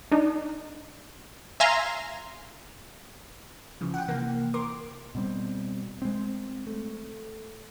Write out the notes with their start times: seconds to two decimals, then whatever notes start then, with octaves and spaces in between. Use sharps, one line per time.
0.12 D4 D#4
1.60 E5 F5 G#5 A#5 C6
3.81 C#3 E3 F3
3.94 F#5 G5
4.08 C3 E3 A#3
4.54 A#4 C6 D6
5.15 B2 G3 C4
6.02 G#3 C4
6.67 A3